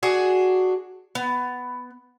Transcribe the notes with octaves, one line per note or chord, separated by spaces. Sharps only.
D4 F#4 G#4
B3